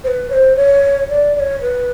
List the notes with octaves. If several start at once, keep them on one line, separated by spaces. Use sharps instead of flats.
C5
B4
C#5
C5
C#5
D5
D5
C#5
B4